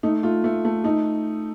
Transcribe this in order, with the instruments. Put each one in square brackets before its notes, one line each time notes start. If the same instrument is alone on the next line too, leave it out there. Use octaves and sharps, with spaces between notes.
[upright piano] A3 D#4
A3 F4
A3
A3
A3 D#4